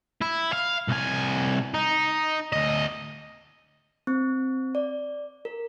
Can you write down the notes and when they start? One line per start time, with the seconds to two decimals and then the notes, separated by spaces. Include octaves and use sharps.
0.21 E4
0.52 F5
0.88 C2 G#5
1.74 D#4
2.53 D2 D#5
4.07 C4
4.75 D5
5.45 A#4